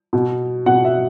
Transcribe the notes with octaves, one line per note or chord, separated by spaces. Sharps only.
B2
B2 F#5
E5